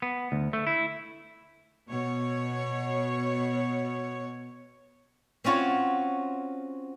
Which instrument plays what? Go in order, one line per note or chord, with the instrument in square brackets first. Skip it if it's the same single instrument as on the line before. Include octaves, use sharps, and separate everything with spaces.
[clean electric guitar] B3
D2
A3
E4
[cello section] B2 C#5
[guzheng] C4 C#4 F4 F#4 C#5